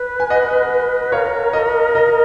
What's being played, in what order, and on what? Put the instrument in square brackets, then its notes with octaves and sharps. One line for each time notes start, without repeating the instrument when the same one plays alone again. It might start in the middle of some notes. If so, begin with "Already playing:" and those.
Already playing: [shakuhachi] B4
[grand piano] G#5
D#5 F#5
[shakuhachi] A#4 [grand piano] C#5 F5
[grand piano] D#5
D#5